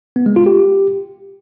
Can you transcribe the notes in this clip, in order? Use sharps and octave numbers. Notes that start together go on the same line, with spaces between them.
B3
G#3
F4
G4